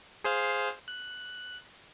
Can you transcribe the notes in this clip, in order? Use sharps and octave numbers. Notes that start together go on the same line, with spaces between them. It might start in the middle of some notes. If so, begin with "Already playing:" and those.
G#4 C5 F5
F#6